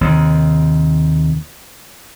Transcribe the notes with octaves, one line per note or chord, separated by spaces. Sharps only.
D#2 C3